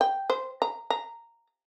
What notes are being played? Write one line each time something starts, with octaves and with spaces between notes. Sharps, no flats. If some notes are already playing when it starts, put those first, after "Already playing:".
G5
C5
A#5
A#5